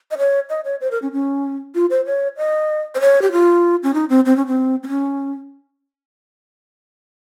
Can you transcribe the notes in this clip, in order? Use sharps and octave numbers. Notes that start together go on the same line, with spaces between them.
D#5
C#5
D#5
C#5
C5
A#4
C#4
C#4
F4
C5
C#5
D#5
C5
C#5
G4
F4
C#4
D#4
C4
C4
C#4
C4
C4
C#4